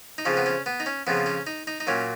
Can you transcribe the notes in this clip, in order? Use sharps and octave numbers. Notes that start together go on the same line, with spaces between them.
D#4
F2 C#3 F3 C#4
B3
C#4
B3
D#4
C#4
F2 C#3 F3 B3
C#4
D#4
D#4
D#4
A#2 F#3 C#4